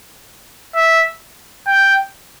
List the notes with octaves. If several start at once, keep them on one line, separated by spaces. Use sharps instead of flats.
E5
G5